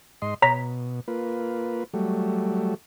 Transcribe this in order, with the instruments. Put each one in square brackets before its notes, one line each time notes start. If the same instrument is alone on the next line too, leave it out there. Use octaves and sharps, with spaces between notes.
[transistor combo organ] G#2 D#5 C6
[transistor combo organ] B2 [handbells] C#5 A#5 B6
[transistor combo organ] A#3 F4 B4
F#3 G3 A3